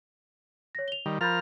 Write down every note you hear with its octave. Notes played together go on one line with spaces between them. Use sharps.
C#5 A#6
F7 G7
D#3 G3
F3 A#4 B5 F6 G6 A6